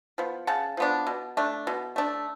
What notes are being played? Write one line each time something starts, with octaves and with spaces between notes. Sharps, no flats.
F3 B3
C#3 F#5 A5
F3 B3 D4
B2
A3 D4
B2
A3 D4